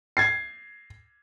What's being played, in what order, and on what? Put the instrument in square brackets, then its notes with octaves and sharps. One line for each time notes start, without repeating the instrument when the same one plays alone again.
[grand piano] G#6 A6 C7